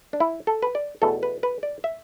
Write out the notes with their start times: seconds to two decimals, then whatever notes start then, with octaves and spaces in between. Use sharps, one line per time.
0.13 D4
0.20 E4
0.47 A4
0.62 B4
0.75 D5
1.02 E2 B2 A3 A4
1.23 B4
1.43 B4
1.63 D5
1.84 E5